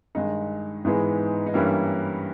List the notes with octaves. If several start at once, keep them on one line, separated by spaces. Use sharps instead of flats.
G2 D#3 G#3 D#4
G#2 E3 G#3 B3
D#4
G2 E3 G3 A#3 C#4 E4